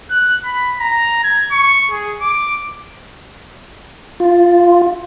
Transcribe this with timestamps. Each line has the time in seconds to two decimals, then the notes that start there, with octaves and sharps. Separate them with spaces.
0.11 F#6
0.45 B5
0.79 A#5
1.23 G#6
1.52 C#6
1.90 G#4
2.21 D6
4.20 F4